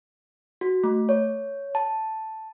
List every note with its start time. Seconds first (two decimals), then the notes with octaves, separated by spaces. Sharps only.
0.61 F#4
0.83 A3
1.09 C#5
1.75 A5